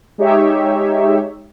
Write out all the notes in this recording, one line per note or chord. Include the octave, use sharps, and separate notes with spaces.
G#3 D#4 G4 C#5 E5